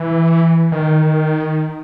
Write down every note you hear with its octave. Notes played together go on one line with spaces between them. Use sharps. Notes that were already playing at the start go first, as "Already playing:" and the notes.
Already playing: E3
D#3